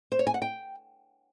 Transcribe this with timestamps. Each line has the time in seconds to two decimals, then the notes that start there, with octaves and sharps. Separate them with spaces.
0.12 C5
0.19 C#5
0.27 G#5
0.34 F#5
0.42 G5